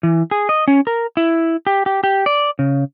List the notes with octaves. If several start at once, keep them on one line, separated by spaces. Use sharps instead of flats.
E3
G#4
D#5
C#4
A#4
E4
G4
G4
G4
D5
C#3